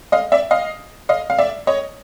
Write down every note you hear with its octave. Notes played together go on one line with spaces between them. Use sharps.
D#5 F5
D5 E5
D#5 F5
D#5 F5
F5
D5 E5
C#5 D#5